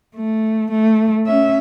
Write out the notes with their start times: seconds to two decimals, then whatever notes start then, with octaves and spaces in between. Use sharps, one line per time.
0.16 A3
0.71 A3
1.26 C#4 E5